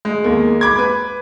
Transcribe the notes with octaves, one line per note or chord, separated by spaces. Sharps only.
G#3
D#2 A#3
B5 D6 G#6
B4